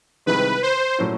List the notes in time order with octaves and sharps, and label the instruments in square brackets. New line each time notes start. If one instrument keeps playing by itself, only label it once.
[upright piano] C2 C3 D#3 G#3 [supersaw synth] B4
[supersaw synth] C5
[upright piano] A#2 F#3 A3 C#4 E4